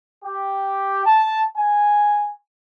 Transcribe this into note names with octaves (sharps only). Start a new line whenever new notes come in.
G4
A5
G#5